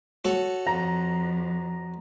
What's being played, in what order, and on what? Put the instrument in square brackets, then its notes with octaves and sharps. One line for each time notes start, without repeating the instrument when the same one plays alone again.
[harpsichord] F#4 A4 C#5
[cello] F2 [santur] A#5